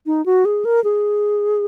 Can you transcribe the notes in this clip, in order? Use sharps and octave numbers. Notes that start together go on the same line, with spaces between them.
D#4
F#4
G#4
A#4
G#4